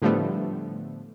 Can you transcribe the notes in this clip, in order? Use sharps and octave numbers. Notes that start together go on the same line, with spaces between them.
A2 D3 F3 G3 A3 B3